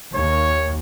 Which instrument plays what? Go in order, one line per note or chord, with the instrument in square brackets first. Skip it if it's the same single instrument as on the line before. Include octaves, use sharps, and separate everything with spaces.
[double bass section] D#2 [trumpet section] C#5